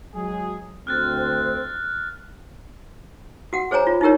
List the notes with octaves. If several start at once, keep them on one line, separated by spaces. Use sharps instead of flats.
F#3 G#3 G#4
D2 C4 F6 F#6 A6
F#4 F#5
G#4 C5 C#5 G#5 A#5
F4
D#4 E4 G4 A#4 C#5